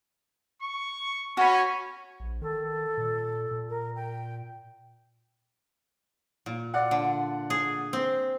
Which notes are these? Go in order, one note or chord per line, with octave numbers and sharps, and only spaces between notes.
C#6
C#4 F#4 B5
A#1
D#3 A4
A#2
A#2
A#4
G5
A#2
F4 D5 F#5
D3
G#4
C4